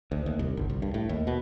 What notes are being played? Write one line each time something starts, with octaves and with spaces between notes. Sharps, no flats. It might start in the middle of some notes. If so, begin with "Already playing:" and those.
D2
D#2
C2
G1
C2
G2
A2
D#2
B2